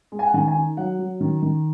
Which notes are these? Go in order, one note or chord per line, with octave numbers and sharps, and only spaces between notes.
G#3
G#5
F#5
D#3 G#5
G#5
D#4
F#3 F#5
F#3
D#3
D#3